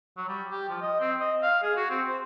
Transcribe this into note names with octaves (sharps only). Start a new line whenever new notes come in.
F#3
G3
G4
F3
D#5
C4
D#5
F5
G#4
F#4
C4
C5